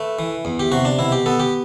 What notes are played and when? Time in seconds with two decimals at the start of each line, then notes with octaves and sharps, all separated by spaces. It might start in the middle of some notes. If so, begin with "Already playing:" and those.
Already playing: A3 B4
0.19 E3
0.45 E2
0.60 G4
0.72 C3 F#4
0.85 D4
0.99 B2 E4
1.12 G4
1.26 B3 A4
1.40 G4